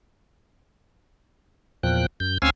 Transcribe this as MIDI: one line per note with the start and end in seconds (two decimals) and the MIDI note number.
1.83 2.06 40
1.83 2.06 46
1.83 2.06 53
1.83 2.06 79
1.83 2.06 90
2.20 2.38 42
2.20 2.38 91
2.42 2.50 38
2.42 2.50 60
2.42 2.50 61
2.42 2.50 77
2.42 2.50 80
2.42 2.50 88